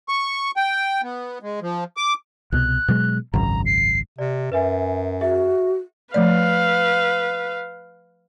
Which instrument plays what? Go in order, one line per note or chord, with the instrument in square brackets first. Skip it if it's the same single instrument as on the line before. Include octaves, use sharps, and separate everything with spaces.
[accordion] C#6
G5
B3
G#3
F3
D6
[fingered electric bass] C2 B2 [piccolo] F#6
[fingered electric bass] B2 F#3 G#3
[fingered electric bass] G#1 C#2 F#2 [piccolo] A#5
[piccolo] C7
[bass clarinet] C3 [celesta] D5
[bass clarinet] F#2 [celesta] B4 E5 G#5
[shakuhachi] F#4 [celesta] G#4 E5
[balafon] F3 A3 D5 [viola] B4 F5